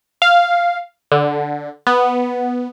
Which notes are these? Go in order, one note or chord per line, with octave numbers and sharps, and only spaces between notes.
F5
D3
B3